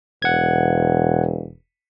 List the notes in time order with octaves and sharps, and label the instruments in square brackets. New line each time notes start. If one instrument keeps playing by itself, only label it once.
[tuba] E1 [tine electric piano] F#5 G#6